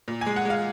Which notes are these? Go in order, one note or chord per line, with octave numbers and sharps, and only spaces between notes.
A#2
G#5
G#3
F#5
G#3 F5